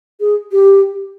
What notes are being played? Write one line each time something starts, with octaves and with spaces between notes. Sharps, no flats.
G#4
G4